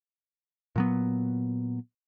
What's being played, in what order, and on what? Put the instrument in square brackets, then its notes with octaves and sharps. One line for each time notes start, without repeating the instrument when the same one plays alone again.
[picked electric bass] A#2 F#3 B3